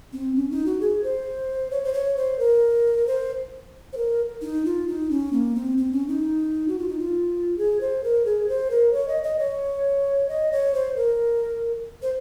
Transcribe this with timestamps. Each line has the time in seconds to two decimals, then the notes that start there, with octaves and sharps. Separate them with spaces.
0.13 C4
0.36 C#4
0.51 D#4
0.66 F#4
0.81 G#4
1.04 C5
1.71 C#5
1.84 C5
1.94 C#5
2.17 C5
2.39 A#4
3.07 C5
3.93 C5
3.97 A#4
4.42 D#4
4.65 F4
4.88 D#4
5.11 C#4
5.33 A#3
5.55 C4
5.78 C4
5.92 C#4
6.08 D#4
6.68 F#4
6.79 F4
6.88 D#4
6.99 F4
7.58 G#4
7.81 C5
8.04 A#4
8.25 G#4
8.49 C5
8.71 A#4
8.93 C#5
9.08 D#5
9.24 D#5
9.39 C#5
10.29 D#5
10.52 C#5
10.74 C5
10.96 A#4
12.02 C5